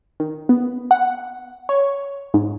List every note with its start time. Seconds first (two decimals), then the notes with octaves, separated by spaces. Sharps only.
0.20 D#3
0.49 B3
0.91 F#5
1.69 C#5
2.34 G#2